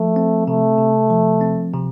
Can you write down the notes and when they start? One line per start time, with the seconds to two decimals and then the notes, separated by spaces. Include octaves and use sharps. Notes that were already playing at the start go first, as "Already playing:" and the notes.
Already playing: F3 A3
0.16 C4
0.48 C3 A3
0.78 C3
1.10 F3
1.41 C4
1.73 C3